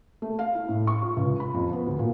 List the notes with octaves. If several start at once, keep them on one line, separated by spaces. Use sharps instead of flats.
A3
F5
E4
A2
C#6
F4
C#2
B5
F2
B3
D2
A#2